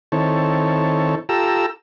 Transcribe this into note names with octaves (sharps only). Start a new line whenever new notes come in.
D#3 C4 E4 A4 C#5
F4 G4 A4 A#5 E6